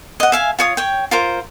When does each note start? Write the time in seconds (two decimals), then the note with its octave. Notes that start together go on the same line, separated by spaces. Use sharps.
0.20 D#5 F#5
0.32 E5 F5 G#5
0.59 F4 C#5 D#6
0.77 C#5 G5
1.11 F4 A#4 C5